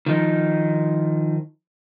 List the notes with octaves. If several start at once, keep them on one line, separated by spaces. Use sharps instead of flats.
D#3 F3 D#4